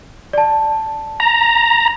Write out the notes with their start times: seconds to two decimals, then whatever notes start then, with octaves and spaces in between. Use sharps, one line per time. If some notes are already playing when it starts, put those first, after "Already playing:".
0.33 D5 A5
1.20 A#5